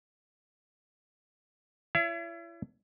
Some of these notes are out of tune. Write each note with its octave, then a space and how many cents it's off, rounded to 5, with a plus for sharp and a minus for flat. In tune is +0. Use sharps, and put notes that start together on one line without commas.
E4 +35 C#5 +40 E5 +35